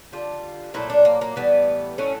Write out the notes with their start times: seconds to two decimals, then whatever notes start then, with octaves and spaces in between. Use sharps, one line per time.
0.12 D3 G3 F4
0.74 A#2 F#3 A3 E4
0.90 D4
1.05 A#3
1.21 A#3
1.36 A2 E3 G3 B3
1.98 A2 F#3 A3 C#4